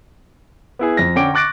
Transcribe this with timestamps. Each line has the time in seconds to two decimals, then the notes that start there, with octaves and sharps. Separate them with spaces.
0.79 B3 E4 G#4
0.97 F2 A#6
1.16 D3 C#4 G5 D6 D7
1.34 C#6 D6 F#6 A6 A#6 D7